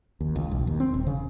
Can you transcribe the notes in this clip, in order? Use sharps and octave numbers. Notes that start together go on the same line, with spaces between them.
D#2
C#2
B1
D#2
C4
D#1
C#3